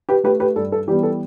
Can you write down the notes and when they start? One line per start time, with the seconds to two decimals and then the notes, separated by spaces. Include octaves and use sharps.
0.09 G4 B4
0.24 A3 G4 B4
0.40 G4 B4
0.56 G2 A4
0.72 A4
0.87 E3 G3 B3 G4
1.03 A4